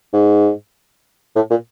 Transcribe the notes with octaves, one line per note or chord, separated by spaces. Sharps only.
G#2
A2
A#2